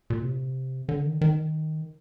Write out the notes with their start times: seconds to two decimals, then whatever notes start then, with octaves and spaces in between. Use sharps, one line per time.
0.10 A#2
0.22 C3
0.89 D3
1.05 D#3
1.21 D#3